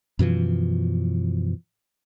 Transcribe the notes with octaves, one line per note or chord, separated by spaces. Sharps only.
F#2 B2 E3 F3